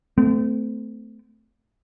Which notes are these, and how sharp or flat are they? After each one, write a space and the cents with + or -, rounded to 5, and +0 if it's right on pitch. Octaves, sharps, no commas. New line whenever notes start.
A3 +0 C4 -35